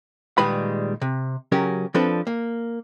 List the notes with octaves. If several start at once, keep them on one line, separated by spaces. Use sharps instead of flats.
A#2 D#3 G3 G#3 B4 B5
C3
C#3 F#3 C#4 G4 A#4
F3 C4 D4 A4 B4
A#3